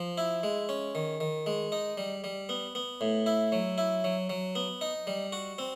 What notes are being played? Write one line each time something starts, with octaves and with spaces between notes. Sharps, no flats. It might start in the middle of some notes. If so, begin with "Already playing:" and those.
Already playing: F3
E4
G#3
C#4
D#3
D#3
G#3
D#4
G3
G3
B3
B3
A2
E4
F#3
E4
F#3
F#3
B3
D#4
G3
F#4
C4